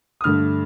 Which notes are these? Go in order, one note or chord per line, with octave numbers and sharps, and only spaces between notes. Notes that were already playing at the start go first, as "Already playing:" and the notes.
D#6
G2 D3 A3 F6